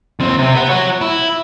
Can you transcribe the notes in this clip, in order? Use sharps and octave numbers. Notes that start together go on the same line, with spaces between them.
D#2 C4
C3 C4
B4 F#5
F#4 C#5
E4